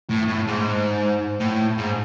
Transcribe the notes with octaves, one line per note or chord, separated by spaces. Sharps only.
A2
A2
G#2
A2
G#2